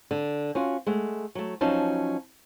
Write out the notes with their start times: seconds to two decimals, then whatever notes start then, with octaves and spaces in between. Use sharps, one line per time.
0.11 D3
0.55 C#4 F4 F#4
0.87 G#3 A3 F#5
1.35 F#3 A3
1.61 F3 F#3 C#4 D#4 A5